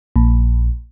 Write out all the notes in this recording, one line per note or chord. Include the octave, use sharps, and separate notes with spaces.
A#1